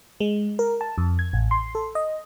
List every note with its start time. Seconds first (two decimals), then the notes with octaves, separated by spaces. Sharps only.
0.20 G#3
0.59 A#4
0.81 A5
0.98 F2
1.19 G#6
1.33 A1
1.51 C6
1.75 A4
1.95 D#5